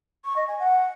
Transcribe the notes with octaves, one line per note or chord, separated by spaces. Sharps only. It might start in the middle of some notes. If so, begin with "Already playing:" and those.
C#6
D#5
G#5
F#5